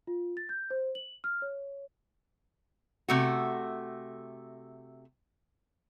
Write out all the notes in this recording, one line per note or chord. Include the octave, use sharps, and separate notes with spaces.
F4
A6
G6
C5
F#7
F6
C#5
C3 A3 F#4